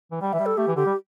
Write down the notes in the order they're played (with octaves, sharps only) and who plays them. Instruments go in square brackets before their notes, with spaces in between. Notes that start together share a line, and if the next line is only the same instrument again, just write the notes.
[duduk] E3
[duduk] G3 [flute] G5
[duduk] E3 [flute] E5
[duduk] G3
[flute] A4
[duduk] A3 [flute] G4
[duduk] E3
[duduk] D3 [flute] G4
[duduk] G3